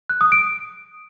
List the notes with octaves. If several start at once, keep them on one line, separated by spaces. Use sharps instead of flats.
F#6
D#6
D7